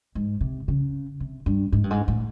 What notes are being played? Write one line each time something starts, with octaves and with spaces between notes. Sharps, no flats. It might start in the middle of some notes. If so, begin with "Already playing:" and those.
G#2
C3
C#3
C3
G2
G#2
G2
G#2
A2